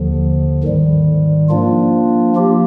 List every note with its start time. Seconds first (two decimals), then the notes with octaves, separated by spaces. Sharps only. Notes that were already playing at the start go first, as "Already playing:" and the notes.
Already playing: D#2 D3 F3
0.63 G#2 D#3 G3
1.49 F3 A#3 D4 F4
2.35 F3 A#3 G4